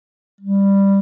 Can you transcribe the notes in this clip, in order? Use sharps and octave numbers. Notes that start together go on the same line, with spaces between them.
G3